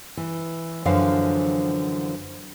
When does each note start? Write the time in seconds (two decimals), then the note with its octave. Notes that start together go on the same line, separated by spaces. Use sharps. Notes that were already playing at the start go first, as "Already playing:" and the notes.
0.17 E3
0.85 F#2 D3 E3 F3 F5